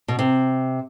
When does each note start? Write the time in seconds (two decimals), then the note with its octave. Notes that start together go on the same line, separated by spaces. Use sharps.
0.08 B2
0.19 C3